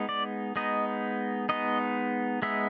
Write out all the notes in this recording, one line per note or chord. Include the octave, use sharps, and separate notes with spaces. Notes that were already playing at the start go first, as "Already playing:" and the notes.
Already playing: G#3 B3 D#4
D5
G#3 B3 D#4 D#5
G#3 B3 D#4 D#5
G#3 B3 D#4 E5